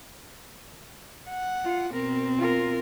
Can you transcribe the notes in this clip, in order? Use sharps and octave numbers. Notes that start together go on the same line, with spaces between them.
F#5
F4
B2 C4 A#4
F4 A#4